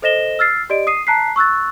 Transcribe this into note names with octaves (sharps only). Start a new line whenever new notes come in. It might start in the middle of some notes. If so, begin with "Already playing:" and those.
A4 C5 D#5 A#6 E7 G7
E6 F6 A6 C7
G4 D5 D#5 D7
D#6 C7 D#7
A5 A#5 F#6 B6 C7
C#6 E6 F#6 A6